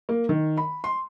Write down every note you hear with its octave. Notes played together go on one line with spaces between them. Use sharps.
A#3
D#3
B5
C6